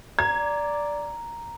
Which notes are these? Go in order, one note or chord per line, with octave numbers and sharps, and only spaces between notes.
D5 A#5 G#6